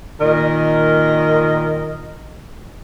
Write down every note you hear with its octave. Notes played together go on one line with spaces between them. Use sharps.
A#2 D#3 A#4 D#5